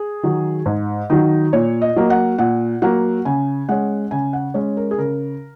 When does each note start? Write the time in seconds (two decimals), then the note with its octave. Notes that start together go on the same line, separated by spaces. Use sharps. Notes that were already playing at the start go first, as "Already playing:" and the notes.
Already playing: G#4
0.23 D#3 F#3
0.66 G#2
1.10 D#3 F#3 D#4
1.53 A#2 C#5
1.82 D#5
1.96 F#3 A#3
2.10 F#5
2.38 A#2 F#5
2.82 F#3 A#3 F#5
3.25 C#3 G#5
3.69 G#3 C#4 F#5
4.11 C#3 G#5
4.33 F#5
4.54 G#3 C#4 C#5
4.77 A#4
4.91 G#4
4.98 C#3 A#4